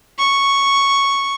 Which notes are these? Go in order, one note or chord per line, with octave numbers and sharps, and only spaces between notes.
C#6